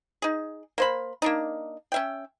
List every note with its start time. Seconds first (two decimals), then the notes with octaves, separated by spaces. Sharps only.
0.22 D#4 G#4
0.78 A#3 C5 B5
1.22 A#3 D4 D#4
1.92 C#4 E5 G5